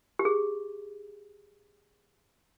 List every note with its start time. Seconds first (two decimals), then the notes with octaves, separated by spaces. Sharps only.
0.19 G4
0.25 G#4